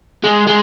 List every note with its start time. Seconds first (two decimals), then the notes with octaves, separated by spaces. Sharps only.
0.24 G#3
0.47 G#3